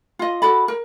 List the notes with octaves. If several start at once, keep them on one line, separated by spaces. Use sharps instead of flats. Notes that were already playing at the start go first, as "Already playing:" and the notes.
F4 D#5
F#4 A4 D5 B5
A#4